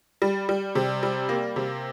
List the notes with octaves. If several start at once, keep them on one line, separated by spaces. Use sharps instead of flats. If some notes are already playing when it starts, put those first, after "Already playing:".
G3
G3
C3
G3
A#3
C3